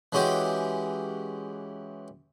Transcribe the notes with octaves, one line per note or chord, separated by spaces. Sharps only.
E3 G#3 C#4 F#4 G4